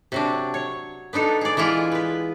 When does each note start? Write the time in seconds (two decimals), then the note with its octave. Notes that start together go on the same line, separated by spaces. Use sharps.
0.12 C3 F#3 D4
0.54 C#5
1.13 B3 D4 D#4 A4
1.41 G#4 D5
1.57 E3 G#3 E4 F4
1.91 B3 B4